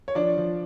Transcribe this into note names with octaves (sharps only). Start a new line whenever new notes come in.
C#5
F3 D4 D5
F3